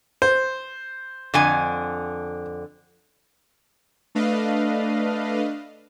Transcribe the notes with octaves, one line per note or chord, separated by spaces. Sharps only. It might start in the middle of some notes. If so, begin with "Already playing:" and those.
C5
F2 D3 G#5
A3 D4 B4 D#5 F5